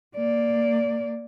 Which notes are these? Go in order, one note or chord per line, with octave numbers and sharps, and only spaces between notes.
A#3 D5